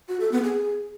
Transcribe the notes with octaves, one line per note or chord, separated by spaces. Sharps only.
F#4
A4
B3
G#4